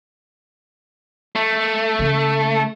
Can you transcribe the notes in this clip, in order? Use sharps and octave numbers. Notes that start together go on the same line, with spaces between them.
A3
C#3